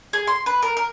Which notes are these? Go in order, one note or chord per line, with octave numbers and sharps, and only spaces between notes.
G#4
C6
B4
A#4
A#4